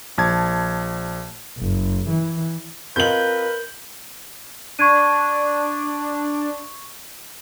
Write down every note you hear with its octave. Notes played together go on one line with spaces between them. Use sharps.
A#1 A5 G#6
F#1
E3
C4 F4 A#4 B4 D#5 G6 F#7
D4 C#6 G#6 D#7